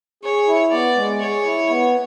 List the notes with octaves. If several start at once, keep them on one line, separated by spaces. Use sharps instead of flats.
G#4 C#5
E4
B3 D5
G#3
G#4 C#5
E4
B3